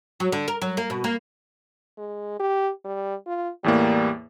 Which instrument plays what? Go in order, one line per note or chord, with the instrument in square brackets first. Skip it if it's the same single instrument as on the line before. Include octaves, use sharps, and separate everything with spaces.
[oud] F#3
D3
A#4
F#3
A#3
B2
A#3
[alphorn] G#3
G4
G3
F4
[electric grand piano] E2 A2 A#3 [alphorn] G3